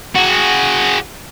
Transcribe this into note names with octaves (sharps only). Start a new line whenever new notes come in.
F#4 G#4